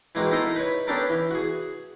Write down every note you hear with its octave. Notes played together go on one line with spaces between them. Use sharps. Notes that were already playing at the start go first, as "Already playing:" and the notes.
E3 G#3 A#3 C4 F#4
D#4 E4 A4 A#4 C5 D#5
B4 C#5
B3 C#4 D4 G4 A4 A#4
E3
F#4 G#4